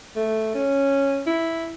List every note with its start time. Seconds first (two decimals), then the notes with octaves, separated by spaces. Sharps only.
0.16 A3
0.55 C#4
1.27 E4